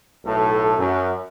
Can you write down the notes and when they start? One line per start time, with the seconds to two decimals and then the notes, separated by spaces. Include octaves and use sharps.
0.25 B1 A2 A4
0.78 F#2